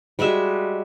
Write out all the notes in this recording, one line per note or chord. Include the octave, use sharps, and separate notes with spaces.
G3 G#3 F#4 E5